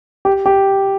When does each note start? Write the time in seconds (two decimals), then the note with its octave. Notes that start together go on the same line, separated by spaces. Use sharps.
0.25 G4
0.46 G4